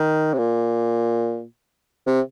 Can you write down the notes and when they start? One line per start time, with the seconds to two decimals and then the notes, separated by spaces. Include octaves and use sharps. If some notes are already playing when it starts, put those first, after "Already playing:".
Already playing: D#3
0.33 C3
0.38 A#2
2.07 C3